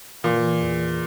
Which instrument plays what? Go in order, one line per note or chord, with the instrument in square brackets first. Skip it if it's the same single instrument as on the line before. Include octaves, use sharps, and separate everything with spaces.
[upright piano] A#2 [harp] E3
[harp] E2